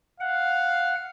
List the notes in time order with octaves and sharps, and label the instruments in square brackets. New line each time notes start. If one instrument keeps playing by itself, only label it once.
[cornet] F5 [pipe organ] F#5